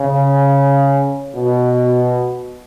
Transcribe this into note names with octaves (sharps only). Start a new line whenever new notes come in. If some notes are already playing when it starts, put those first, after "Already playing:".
Already playing: C#3
B2